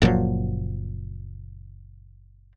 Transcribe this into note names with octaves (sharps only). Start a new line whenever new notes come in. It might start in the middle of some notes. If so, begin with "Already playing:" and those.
F#1 A#2 F3 F#3